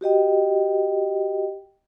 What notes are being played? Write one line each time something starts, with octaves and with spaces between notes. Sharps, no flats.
F#4 G4 D#5 G5